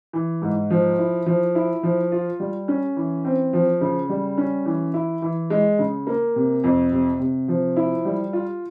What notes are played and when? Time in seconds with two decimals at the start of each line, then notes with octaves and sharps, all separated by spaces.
0.13 E3
0.42 G#2
0.70 F3
0.98 E4
1.26 F3
1.55 E4
1.83 F3
2.12 F4
2.40 G3
2.68 C#4
2.97 E3
3.25 C4
3.53 F3
3.81 C#3
4.09 G3
4.38 C#4
4.66 E3
4.94 E4
5.22 E3
5.50 G#3
5.79 C#3
6.07 A#3
6.36 C3
6.64 F2
6.92 C3
7.20 C3
7.48 F3
7.76 E4
8.05 G3
8.33 F4